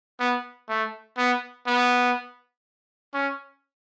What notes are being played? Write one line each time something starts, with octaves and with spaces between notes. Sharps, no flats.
B3
A3
B3
B3
C#4